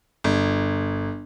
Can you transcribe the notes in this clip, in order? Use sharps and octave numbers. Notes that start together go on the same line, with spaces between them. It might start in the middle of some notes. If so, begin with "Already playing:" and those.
G1